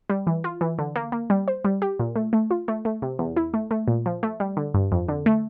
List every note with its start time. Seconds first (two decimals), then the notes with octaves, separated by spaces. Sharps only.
0.09 G3
0.27 E3
0.44 F4
0.61 E3
0.79 D3
0.96 A#3
1.12 A#3
1.30 G3
1.48 C5
1.64 G3
1.82 G4
1.99 A#2
2.16 A3
2.33 A3
2.51 F4
2.68 A3
2.85 A3
3.02 C3
3.19 E2
3.36 E4
3.54 A3
3.71 A3
3.88 A#2
4.06 F3
4.23 A3
4.40 G3
4.57 D3
4.74 G2
4.92 F2
5.09 D3
5.26 A3